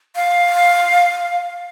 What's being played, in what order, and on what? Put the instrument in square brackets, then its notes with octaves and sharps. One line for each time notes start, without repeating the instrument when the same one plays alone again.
[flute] F5